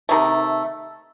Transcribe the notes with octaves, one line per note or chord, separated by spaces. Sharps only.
C3 D#3 A3